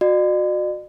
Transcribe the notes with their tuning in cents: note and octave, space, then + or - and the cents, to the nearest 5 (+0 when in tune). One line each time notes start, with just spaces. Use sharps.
F#4 -20 D5 +45